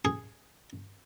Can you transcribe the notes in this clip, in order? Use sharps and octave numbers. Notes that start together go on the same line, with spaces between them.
G#4